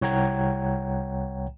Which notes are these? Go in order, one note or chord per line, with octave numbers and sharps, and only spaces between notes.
C2 C#5 F#5 G5 A#5 G#6